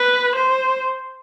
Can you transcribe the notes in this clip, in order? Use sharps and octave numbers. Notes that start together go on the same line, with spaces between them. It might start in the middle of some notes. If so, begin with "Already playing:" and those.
Already playing: B4
C5